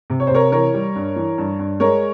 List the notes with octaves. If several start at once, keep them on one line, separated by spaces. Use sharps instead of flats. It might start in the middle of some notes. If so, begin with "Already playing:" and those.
C3
C#5
C5
C3 A#4 C#5
E3 A#4 C#5
G3
G2
E3
G2
G2
G#3 A#4 C#5